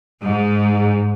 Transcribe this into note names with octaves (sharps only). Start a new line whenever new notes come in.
G#2